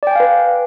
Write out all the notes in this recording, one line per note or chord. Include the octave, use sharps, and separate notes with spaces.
B4 D5 F5 G5 G#5